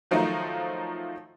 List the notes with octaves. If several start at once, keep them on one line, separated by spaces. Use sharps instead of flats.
D#3 F3 F#3 A3 D#4